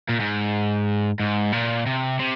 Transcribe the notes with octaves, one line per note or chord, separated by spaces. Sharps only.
A#2
G#2
G#2
A#2
C3
C3